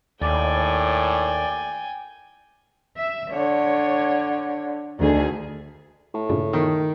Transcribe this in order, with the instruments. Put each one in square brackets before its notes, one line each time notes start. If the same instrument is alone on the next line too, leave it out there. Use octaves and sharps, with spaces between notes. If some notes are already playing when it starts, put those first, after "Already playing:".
[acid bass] D#2 [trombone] A2 [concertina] D5 [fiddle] G5 G#5
[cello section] E5
[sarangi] D3 [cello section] C#5
[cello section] D2 G#4 [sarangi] D#3
[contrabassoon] A2
[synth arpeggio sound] G2 A#2 C#3
[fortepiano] D#3